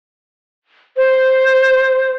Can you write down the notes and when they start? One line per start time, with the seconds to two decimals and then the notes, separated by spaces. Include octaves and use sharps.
0.97 C5